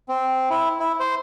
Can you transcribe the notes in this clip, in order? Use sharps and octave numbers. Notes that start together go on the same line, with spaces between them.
C4
E4
E4
C5